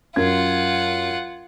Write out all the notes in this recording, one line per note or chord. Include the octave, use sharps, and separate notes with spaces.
F#2 F4 A#4 F#5 G#6